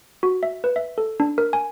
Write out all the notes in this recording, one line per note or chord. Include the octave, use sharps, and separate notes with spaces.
F#4
E5
B4
E5
A4
D4
A#4
G#5